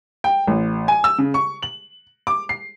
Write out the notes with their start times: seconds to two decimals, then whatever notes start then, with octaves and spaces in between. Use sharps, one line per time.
0.24 G5
0.47 A1
0.88 G#5
1.04 E6
1.18 C#3
1.34 C#6
1.62 F#7
2.27 D6
2.49 C7